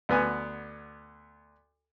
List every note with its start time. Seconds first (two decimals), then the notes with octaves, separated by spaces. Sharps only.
0.09 D2 B3 G#5